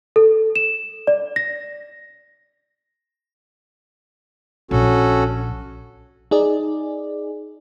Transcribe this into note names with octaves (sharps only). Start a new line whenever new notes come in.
A4
E7
D5
A#6
A#1 C#4 F#4 A4
D#4 G#4 D5